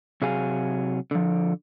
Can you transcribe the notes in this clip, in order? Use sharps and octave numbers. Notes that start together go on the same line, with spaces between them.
C3 F#3 G#4 F5 G#5
D3 F3